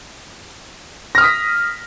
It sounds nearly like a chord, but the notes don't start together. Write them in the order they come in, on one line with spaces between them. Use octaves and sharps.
A#6 F6 D#6 B6